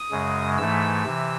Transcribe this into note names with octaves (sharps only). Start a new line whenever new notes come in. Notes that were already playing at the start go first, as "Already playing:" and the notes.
Already playing: D#6
F#2 C#3 G#3
G#2 E3 A3 E6
C3 E3